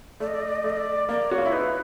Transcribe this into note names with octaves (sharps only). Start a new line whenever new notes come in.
A3 D5
D#5
D5
D#5
D5
D#5
A3 D5
D#5
D5
A#3 D5
F#4 C#5
F4
E4
D#4 B4